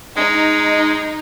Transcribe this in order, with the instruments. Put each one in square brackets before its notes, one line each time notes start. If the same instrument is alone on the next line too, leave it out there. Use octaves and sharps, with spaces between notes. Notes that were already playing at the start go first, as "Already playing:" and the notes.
[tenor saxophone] G#3 [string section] D#4